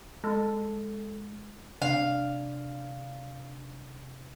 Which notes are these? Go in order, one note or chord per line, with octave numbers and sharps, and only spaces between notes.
G#3 A4
C3 D4 F5